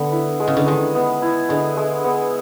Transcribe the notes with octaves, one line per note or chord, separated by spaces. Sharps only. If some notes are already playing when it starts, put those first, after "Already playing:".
Already playing: D3 B3
E4
G#3
C#3
D3
D#3 G#3
B3
E4
D3 G#3
G#3
B3